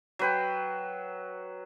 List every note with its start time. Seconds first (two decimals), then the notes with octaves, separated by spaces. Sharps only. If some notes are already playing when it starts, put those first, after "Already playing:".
0.19 F#3 B4 G5